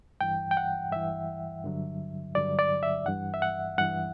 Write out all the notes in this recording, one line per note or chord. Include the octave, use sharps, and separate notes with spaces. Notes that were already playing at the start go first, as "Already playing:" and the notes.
G2 E3 G5
G5
F#5
G2 E3 E5
G2 D3 F#3
G2 D3 F#3 D5
D5
E5
G2 E3 F#5
E5
F#5
G2 E3 F#5